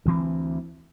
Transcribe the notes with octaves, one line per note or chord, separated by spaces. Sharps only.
D2 E3 C4